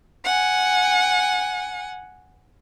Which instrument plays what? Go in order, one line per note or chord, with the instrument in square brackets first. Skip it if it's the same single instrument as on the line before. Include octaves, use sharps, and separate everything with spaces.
[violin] F#5 G#5